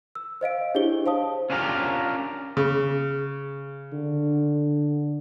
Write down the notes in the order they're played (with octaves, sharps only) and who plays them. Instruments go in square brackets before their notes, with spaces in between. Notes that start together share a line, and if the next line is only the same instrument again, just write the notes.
[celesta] E6
C5 D#5 F5 D7
D4 E4 G4 G#4 C#5 G7
C5 F5 A5 D#6
[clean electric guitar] C#4 D4 F4 G4 A#4
[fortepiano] C#3
[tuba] D3